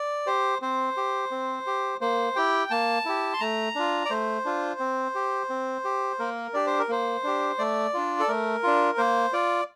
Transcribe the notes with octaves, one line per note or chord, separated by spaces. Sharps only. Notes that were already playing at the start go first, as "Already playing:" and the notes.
Already playing: D5
G4 C5
C4 C5
G4
C4
G4
A#3 C5
E4 G4 G5
A#3 A5
E4 G4
C6
A3 A#5
D4 F4
D5
A3 C5
D4 F4
C4
G4
C4
G4
A#3 A#4
D4 G4 D5
C5
A#4
A#3 C5
D4 G4
A3 D5
D4 F4
A4
A3 A#4
D4 F4
A#3 C5
F4 D5